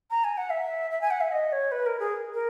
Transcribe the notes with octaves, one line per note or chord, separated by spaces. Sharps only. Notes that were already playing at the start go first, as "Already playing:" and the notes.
A#5
G#5
F#5
E5
E5
G#5
F#5
E5
D#5
C#5
B4
A#4
G#4
A#4